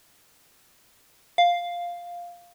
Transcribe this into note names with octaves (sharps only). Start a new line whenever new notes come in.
F5